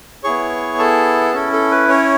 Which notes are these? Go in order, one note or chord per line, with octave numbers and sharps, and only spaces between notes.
B3 E4 G#4 C#5 C#6
A4 A5
C#4 E4 A4
A4
B4
C#4 C#5